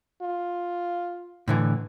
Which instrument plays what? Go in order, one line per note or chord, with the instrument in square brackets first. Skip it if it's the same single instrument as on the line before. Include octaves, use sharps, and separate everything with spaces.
[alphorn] F4
[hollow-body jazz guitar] A2 D3 E3